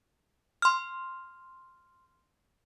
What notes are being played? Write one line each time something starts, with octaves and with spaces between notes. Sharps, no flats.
C6 F6